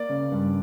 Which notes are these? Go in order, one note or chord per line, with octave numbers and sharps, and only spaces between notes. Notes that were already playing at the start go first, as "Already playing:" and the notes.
Already playing: A#3 D5
C#3
G2